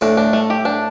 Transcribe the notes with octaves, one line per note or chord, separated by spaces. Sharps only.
A2 D4
D4
A3
G4
D4